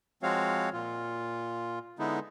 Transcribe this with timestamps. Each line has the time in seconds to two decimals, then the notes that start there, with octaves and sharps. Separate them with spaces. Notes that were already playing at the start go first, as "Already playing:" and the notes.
0.23 F3 G#3 C4 F#4 C#5 F5
0.73 A#2 F4
1.99 D3 G#3 B3 D#4 E4